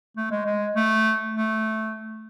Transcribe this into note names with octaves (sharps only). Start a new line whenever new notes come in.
A3
G#3
G#3
A3
A3